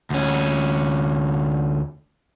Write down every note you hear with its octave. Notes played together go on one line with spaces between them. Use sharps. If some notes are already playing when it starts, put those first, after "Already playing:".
D2 C#4